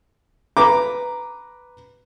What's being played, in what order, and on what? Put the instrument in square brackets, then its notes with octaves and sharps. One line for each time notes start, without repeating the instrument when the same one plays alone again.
[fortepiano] B4 A#5 D6